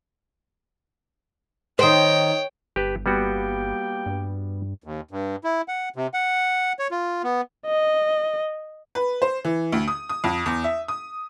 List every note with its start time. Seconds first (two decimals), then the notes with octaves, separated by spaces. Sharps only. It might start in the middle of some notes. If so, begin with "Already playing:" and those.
1.79 D#3 C5 C#5 G5
2.76 G1 G4 B4 A5
3.06 G3 A#3 B3 F#4 G4 G5
4.06 G2
4.84 D#2
5.11 G2
5.44 E4
5.68 F#5
5.96 C3
6.14 F#5
6.79 C#5
6.91 F4
7.24 B3
7.66 D#5
8.95 B4
9.22 C5
9.45 E3
9.72 D2
9.88 D#6
10.09 D#6
10.24 F2
10.46 E2
10.64 E5
10.88 D#6